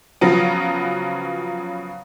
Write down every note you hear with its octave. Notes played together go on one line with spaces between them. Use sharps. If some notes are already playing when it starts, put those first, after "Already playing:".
C#3 F3 F#3 B3